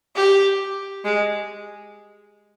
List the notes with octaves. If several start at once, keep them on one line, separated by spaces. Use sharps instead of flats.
G4
G#3